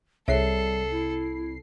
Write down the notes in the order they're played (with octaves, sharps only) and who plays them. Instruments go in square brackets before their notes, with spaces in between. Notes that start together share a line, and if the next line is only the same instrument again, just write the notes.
[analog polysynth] C2 C7 [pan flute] G3 [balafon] G#4 C#5 E5 [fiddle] A4
[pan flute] E4